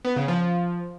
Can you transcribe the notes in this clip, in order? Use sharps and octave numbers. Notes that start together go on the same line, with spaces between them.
B3
C#3
F3